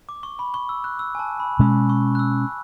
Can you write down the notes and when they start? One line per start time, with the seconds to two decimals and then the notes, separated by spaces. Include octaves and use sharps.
0.09 D6
0.23 C#6
0.39 B5
0.54 C#6
0.69 E6
0.84 F#6
0.99 E6
1.15 G#5
1.19 A5
1.40 B5
1.59 B2 G#3 C#4
1.89 C#6
2.15 F#6
2.19 E6